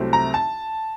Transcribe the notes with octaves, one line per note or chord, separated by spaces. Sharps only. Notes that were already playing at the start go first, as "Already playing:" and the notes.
Already playing: C2 C3 F#3 A3 C4
A#5
A5